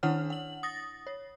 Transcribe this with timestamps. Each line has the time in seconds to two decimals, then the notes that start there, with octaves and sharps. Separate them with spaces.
0.03 D#3 D4 E4 C#5 F#5 F6
0.30 F#5 F#7
0.63 D#6 A6 A#6
1.07 C#5